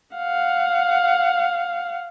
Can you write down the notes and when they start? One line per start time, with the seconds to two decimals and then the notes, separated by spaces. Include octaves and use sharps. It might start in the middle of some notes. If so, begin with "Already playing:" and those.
0.16 F5 F#5